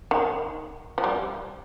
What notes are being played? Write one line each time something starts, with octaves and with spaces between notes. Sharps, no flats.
D#3
F3
G3